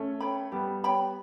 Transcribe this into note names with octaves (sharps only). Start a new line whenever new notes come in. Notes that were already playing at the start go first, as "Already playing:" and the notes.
Already playing: A3 C#4
C#5 G5 B5
G3 B3 G4
C#5 G5 B5